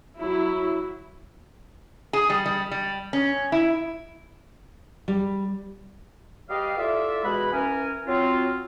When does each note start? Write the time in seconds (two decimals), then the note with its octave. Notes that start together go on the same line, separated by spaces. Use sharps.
0.20 F#3 E4
2.13 G#4
2.30 G3
2.46 G3
2.71 G3
3.13 C#4
3.52 E4
5.08 G3
6.50 G3 G4 B4 D5 D#5 F5
6.77 E4 F4 A4 D5 E5
7.24 B2 E3 G#3 G#4 F#5 B5
7.52 E3 C#4 A#4 G#5
8.07 F#3 C4 F4